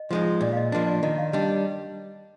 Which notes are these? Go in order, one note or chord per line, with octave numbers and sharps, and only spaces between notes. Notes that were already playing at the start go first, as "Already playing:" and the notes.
Already playing: D#5
F3 G#3 D#4
A#2 D5
F5
D#5
F3 A#3 D4
D5
D#3 D#5
F5
G3 D4 D#5